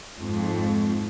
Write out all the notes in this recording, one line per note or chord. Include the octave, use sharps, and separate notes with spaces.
F2 G#2 F3